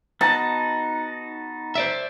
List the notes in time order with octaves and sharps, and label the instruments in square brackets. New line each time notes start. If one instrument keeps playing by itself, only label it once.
[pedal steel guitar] B3 D#4 F#4 [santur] A5
[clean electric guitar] C5 D5 E5